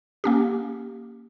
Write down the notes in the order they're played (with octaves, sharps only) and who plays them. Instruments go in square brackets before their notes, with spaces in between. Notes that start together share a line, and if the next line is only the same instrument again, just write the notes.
[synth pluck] A#3 C#4 G4